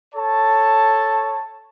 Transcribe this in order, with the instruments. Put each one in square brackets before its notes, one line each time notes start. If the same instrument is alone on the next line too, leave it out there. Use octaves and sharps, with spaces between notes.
[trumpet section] A4 C#5 A5